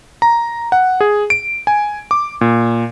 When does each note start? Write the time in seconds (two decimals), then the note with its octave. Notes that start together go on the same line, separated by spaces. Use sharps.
0.22 A#5
0.72 F#5
1.01 G#4
1.30 D7
1.67 G#5
2.11 D6
2.41 A#2